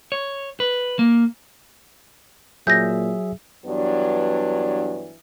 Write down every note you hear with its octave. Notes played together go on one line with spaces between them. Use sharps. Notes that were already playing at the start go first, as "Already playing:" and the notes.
C#5
B4
A#3
A#2 F#3 G#4 E5 G6 A#6
G2 E3 F#3 B3 D4